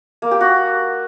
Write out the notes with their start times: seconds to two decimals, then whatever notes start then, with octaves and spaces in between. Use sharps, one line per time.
0.22 A#3
0.31 G4
0.41 F#4